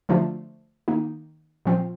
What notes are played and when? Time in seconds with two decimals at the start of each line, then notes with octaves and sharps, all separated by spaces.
0.09 D3 F3 A3 D4 F4
0.88 D#3 A#3 D#4
1.65 A#2 F3 C4 F4